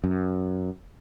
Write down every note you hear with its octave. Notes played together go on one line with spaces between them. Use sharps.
F#2